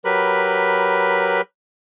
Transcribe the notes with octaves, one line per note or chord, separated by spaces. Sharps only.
F#3 G4 A#4 B4 B5